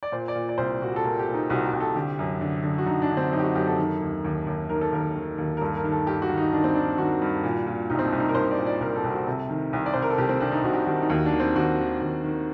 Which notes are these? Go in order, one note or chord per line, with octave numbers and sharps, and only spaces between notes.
D5
A#2 C5
D5
A#2
D5
C2 C5
A#2 F#4
G4
A4
A#2 A#4
G4
A#2
D#4
C2 F#4
G4
C2
A4
D3 G4
F#2
D3
D3
F#4
D3 D#4
D4
D3
C4
F#2 D#4
G4
F#4
F#2 G4
A4
D#3
D#2
D#2
D#2
D#3 A#4
A4
D#2 A#4
D#3
D#2
A#4
G2 A4
A#4
D#3
A4
G2 G4
F#4
D#3
D#4
D#3 D4
C4
D#3 D4
D#3 F#4
G2
A#2
A#2
C2 D#4
C4
D4
C2
D#4
A#4
C2 C5
D5
A#2
D5
C2 A#4
A4
C2
F#4
C3 A4
D#3
C2
D5
C2 C5
A#4
A4
C2 G4
C4
C2 D4
D#4
C2 F#4
G4
D#3 F#4
D#4
D#2 F#4
D4
D#3
C4
D#2 F#4
D#3
D#2
D#3